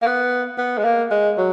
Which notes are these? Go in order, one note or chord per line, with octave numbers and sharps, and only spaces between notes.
A#3
B3
B3
G#3
A#3
G#3
F#3